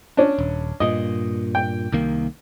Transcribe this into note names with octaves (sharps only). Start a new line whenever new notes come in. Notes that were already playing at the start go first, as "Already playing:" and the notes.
C#4 D4
D#1
G2 A#2 D#5
G5
C2 D#3 A#3